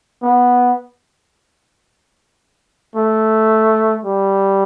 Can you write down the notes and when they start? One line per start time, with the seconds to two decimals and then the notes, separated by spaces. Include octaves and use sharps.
0.23 B3
2.95 A3
4.05 G3